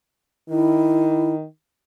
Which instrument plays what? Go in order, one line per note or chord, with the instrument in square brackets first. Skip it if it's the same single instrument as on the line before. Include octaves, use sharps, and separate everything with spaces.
[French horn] D#3 [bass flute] E4